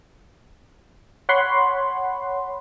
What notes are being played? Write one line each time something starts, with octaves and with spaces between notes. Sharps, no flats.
C#5 F#5 B5 C6